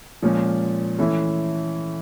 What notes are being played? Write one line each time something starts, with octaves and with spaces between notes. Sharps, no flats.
A#2 F3 G#3 C#4
E3 A3 C#4 E4